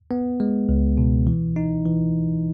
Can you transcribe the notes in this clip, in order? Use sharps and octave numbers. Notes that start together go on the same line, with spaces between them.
B3
G#3
C#2
B2
E3
D#4
E3